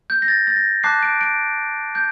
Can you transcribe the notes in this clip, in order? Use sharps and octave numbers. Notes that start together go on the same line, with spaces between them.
G6
A#6
A6
A6
A#6
A5 D6 F#6 C7
D7
D7
G6